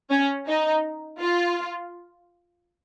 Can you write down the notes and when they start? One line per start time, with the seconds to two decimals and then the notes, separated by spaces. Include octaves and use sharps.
0.11 C#4
0.48 D#4
1.21 F4